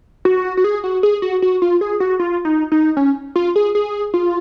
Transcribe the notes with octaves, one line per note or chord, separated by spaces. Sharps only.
F#4
F#4
G#4
F#4
G#4
F#4
F#4
F4
G#4
F#4
F4
D#4
D#4
C#4
F4
G#4
G#4
F4